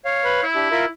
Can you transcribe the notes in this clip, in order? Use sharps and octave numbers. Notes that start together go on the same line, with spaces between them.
C#5 F5
B4
E4
D4 G4 E5
F4 A#4 E5